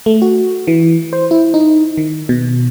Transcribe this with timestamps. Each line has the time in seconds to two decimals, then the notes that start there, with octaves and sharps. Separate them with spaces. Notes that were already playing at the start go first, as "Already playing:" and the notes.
0.06 A3
0.22 F#4
0.67 E3
1.13 C5
1.31 E4
1.54 D#4
1.97 D#3
2.29 B2